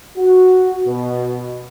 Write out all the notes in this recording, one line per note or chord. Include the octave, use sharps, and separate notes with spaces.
F#4
B2